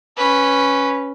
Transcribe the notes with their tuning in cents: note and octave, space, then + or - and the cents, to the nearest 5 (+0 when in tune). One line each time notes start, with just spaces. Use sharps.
C#4 +0 B4 +0